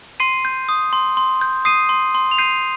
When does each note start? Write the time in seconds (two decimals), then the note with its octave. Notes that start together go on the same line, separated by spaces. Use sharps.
0.20 C6 C7 D#7
0.45 G6
0.69 D#6
0.93 C6
1.17 C6
1.41 G6
1.65 D#6 C7 D#7
1.89 C6
2.15 C6
2.31 F7
2.38 G6 C7 D#7